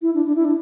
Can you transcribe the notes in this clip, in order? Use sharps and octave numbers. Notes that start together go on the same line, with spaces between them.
E4
D4
D4
E4
D4